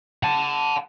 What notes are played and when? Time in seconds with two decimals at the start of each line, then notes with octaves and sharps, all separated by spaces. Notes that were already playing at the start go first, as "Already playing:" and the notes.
0.23 F#5 A5